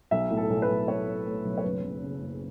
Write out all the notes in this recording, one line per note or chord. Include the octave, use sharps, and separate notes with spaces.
B1 E5
A2
A4
B1
B4
B1
A3 C#5
A3
A3
B1
C#5
F#1 B4
F#1
C#3
F#1